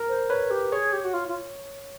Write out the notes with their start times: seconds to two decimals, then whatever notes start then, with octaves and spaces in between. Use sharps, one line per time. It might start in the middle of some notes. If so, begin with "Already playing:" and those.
Already playing: A#4
0.08 C5
0.30 B4 C#5
0.50 G4
0.72 G#4 C#5
0.93 G4
1.04 F#4
1.14 F4
1.28 F4